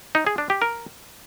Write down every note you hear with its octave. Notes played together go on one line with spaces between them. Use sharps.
D#4
G#4
D4
G4
A#4